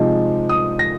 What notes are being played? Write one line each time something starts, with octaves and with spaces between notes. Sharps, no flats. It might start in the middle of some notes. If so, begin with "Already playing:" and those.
Already playing: C3 F3 G#3 D#4
D#6
A#6